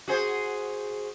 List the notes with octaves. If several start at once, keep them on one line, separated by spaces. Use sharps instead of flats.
F#4 G#4 C5